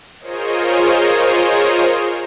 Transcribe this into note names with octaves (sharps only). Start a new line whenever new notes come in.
F4 G#4 A#4 C5 C#5 D#5